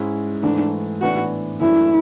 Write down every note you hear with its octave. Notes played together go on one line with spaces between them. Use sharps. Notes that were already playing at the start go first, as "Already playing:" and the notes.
Already playing: G#2 G#3 C#4 E4
G#2 E3 A3 D4
A2 E3 B3 D4 F#4
F#2 E3 A3 D4 E4